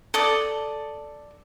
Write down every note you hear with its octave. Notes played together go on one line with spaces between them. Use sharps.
A4 D5 D#6